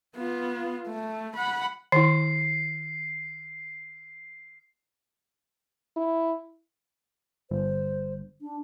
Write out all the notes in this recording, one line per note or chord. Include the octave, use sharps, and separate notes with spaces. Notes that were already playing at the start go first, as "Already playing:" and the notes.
B3 F4
A3
F#5 B5
D#3 E4 C7
E4
G1 C5
D4